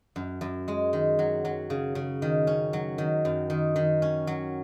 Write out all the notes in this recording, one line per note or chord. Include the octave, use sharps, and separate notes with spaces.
F#2
F#2
G#3
D#3
F#3
F#3
C#3
C#3
D#3
C#4
F#3
D#3
F#2
D#3
D#3
C#4
F#3